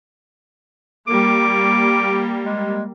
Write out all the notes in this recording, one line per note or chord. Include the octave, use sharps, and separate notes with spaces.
G3 A#3 D6
G#3